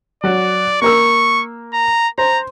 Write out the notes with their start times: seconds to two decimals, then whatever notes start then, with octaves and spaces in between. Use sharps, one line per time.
0.24 F#3 F#4 D5
0.82 A#3 A#4 C#6 E6
1.74 A#5
2.18 C5 A#5